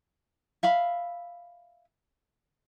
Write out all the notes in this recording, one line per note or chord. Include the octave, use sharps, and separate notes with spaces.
E5 F5 B5